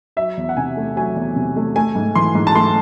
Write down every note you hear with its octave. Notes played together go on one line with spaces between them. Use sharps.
F#3 E5
E2
F#5
C3 G#5
A3
F#3 G#5
E2
C3
A3
A3 G#5
G#2
E3 C6
G#2
A5
A3 C6